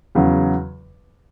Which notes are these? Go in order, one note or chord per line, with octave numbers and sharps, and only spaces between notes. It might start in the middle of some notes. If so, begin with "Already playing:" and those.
E2 C#3 F#3